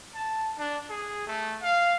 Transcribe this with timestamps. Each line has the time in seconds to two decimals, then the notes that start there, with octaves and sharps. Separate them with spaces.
0.15 A5
0.58 D4
0.90 G#4
1.27 A3
1.63 F5